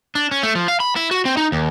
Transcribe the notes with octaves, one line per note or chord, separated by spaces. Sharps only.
D4
C#4
A3
F3
F5
B5
E4
F#4
C4
D#4
D#2